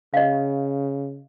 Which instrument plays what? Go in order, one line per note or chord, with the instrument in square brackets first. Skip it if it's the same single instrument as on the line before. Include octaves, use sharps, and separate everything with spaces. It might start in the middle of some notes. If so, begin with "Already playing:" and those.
[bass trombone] C#3 [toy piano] D#5 F5